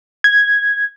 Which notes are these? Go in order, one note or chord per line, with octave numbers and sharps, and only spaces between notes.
G#6